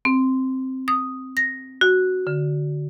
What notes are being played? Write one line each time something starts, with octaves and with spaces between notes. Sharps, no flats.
C4
D#6
A#6
F#4
D3